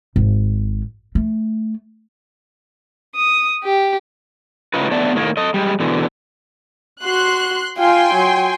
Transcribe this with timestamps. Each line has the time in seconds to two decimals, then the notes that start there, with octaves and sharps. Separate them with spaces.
0.16 G#1
1.15 A3
3.16 D#6
3.64 G4
4.74 A2 C#3 D#4 F4 B4
4.91 A2 D3 B3 D5 E5 A5
5.15 A2 D#3 A#3
5.37 A4 D#5
5.54 G3 G#3
5.80 B2 D3 E3
7.03 F#4 C6 F#6
7.78 F4 G5 G#5 C6
8.15 F#3